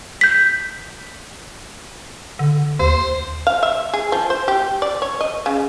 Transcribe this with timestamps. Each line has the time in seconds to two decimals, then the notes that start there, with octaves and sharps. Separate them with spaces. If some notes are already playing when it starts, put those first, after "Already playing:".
0.21 G6 B6
2.39 D3
2.79 D#2 C5
3.47 F5
3.63 E5
3.93 G#4
4.12 F3
4.30 C5
4.48 G4
4.82 D5
5.02 C#5
5.21 D#5
5.46 C#3